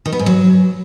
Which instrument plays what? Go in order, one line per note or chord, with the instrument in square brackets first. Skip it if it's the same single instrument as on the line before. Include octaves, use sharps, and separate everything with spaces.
[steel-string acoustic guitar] D#3
B3
G#2
F#3